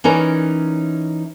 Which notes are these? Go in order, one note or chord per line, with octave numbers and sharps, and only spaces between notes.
E3 C#4 D#4 A#4 C#5 D5